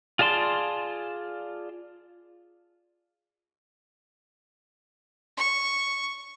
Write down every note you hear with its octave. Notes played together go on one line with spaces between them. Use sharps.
F4 G#4 D5 A5 C6
C#6